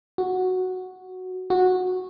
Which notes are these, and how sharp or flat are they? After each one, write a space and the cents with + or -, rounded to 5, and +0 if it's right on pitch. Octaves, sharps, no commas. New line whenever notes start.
F#4 -5
F#4 -10